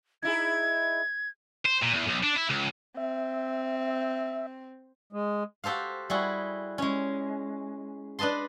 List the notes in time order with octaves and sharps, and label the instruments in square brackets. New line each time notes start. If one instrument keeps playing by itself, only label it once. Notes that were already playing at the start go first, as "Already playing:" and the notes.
[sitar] D#4 E4 G#4 [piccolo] G#6
[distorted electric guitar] C5
A#2
E2
B1
D4
E4
C#2
[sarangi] C4 [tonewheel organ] E5
[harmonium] G#3
[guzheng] F#4 G4 A4 C5 F5
G3 E4 F#4 G#4
G#3 C#4
D4 B4 D#5 A5 C6